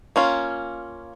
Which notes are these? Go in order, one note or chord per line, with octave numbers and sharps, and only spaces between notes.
A#3 C#4 F4